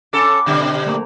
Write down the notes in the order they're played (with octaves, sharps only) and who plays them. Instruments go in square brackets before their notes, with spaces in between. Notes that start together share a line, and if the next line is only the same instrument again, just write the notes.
[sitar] C#4 A4 [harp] F#5 B5 D6
[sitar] B2 D3 G3 [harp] C4
[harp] C4
A3 A#3